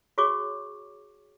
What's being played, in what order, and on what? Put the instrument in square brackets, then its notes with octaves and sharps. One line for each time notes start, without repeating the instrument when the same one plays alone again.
[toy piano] F#4 G#4 C#5 C#6 D6